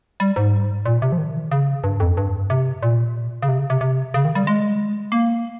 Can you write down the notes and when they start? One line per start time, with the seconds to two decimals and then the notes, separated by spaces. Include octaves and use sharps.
0.20 G3
0.36 G#2
0.86 A#2
1.02 C3
1.12 F3
1.18 D#3
1.52 C#3
1.84 G2
2.00 F2
2.17 G2
2.50 C3
2.83 A#2
3.42 C#3
3.49 C3
3.59 C#3
3.70 C3
3.81 C3
4.14 C#3
4.25 D#3
4.35 G3
4.47 G#3
5.12 A#3